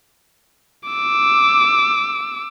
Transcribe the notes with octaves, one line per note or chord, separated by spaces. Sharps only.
D6 E6